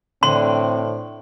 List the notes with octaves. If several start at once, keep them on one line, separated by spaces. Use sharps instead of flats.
A2 D3 C4 C6